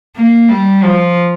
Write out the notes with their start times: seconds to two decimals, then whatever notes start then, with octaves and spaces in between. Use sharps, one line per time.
0.16 A#3
0.49 G3
0.83 F3